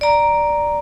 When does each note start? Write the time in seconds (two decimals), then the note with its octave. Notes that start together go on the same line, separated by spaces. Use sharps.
0.01 D5 A#5